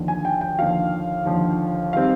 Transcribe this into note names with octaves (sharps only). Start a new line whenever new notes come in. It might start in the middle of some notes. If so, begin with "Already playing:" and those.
Already playing: D#2 D3 F3
G#5
G5
G5
D#2 D3 F3 F5
D#2 D3 F3
D#3 G3 C4 F5